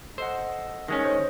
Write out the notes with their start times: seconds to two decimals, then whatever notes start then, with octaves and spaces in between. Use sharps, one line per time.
0.18 A4 C5 D#5 F#5
0.88 D#3 G#3 C#4 A#6
1.04 C5 C#5